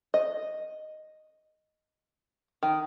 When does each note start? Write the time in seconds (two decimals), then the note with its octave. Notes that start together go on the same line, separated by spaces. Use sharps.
0.14 D#5
2.63 D#3